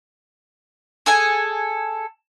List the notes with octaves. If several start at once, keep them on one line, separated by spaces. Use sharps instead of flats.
G#4 A4 G#5